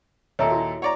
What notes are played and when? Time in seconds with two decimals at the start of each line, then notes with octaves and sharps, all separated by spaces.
0.39 D#2 A#2 A4 C#5 E5 A#5
0.51 E4 F#4
0.82 C#5 D5 F#5 A#5